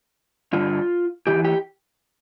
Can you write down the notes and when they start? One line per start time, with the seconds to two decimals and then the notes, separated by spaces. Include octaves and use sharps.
0.53 G2 D3 F4
1.27 E2 C3 E3 G4
1.45 G4